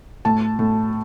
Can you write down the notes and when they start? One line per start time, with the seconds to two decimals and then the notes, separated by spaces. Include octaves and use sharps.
0.25 A2 A5
0.59 A2